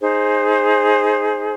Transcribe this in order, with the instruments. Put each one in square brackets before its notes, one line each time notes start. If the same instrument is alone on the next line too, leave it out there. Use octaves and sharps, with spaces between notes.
[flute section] D#4 G#4 C5